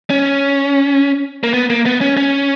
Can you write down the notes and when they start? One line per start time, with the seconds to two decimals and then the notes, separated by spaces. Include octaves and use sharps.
0.10 C#4
1.43 A#3
1.54 B3
1.70 A#3
1.86 B3
2.01 C#4
2.17 C#4